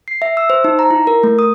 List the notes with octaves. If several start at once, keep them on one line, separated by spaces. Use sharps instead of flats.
C7
E5
E6
C5
D#4
A#5
E4
A#4
A3
D#6